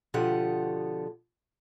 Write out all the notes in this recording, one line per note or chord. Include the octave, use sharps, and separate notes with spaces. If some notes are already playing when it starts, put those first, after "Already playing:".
B2 D3 F3 G4 F#5